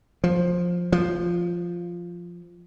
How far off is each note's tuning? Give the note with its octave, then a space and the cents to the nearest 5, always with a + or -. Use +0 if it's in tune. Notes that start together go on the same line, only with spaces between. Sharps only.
F3 +10
F3 -5